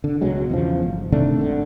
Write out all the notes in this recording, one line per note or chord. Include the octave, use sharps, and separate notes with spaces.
D3
C#2 B2 F#3 G#3
E2 C#3 F3
G1
C3 D#3 A3 D4
G#1 D3